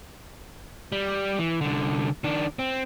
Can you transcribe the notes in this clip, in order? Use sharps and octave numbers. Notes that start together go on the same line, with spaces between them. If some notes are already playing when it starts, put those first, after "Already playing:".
G3
E3
C2 D3
D#3 D4
C4